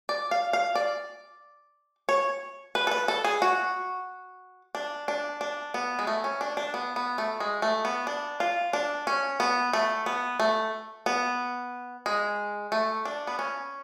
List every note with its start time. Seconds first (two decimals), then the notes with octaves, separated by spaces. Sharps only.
0.09 D5
0.31 F5
0.53 F5
0.75 D5
2.09 C#5
2.75 B4
2.87 A4
2.91 B4
3.08 A4
3.25 G#4
3.42 F#4
4.75 D4
5.08 D4
5.41 D4
5.74 B3
5.99 G#3
6.07 A3
6.24 C#4
6.41 D4
6.57 D4
6.74 B3
6.96 B3
7.18 A3
7.40 G#3
7.62 A3
7.85 B3
8.07 D4
8.40 F4
8.73 D4
9.07 C#4
9.40 B3
9.73 A3
10.06 B3
10.40 A3
11.06 B3
12.06 G#3
12.72 A3
13.05 D4
13.27 B3
13.39 C#4